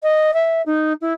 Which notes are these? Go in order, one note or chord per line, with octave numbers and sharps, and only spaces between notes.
D#5
E5
D#4
E4